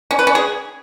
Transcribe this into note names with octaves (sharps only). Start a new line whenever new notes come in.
C#4
B4
C#4
G#4